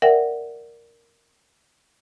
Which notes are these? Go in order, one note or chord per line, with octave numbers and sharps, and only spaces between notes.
A#4 D5 E5 F#5 G5